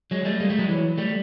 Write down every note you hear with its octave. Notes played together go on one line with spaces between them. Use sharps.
F#3 G#3
G3 A3
G#3 A#3
G3 A3
F#3 G#3
E3 F#3
G3 A3